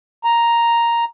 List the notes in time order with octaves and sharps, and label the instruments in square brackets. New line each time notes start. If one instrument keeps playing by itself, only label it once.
[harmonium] A#5